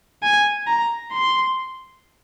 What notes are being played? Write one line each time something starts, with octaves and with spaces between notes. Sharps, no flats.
G#5
A#5
C6